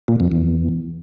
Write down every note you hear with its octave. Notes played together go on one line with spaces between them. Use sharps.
A#2
F2
E2